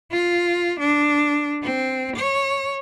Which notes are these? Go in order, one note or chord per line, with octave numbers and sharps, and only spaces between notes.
F4
D4
C4
C#5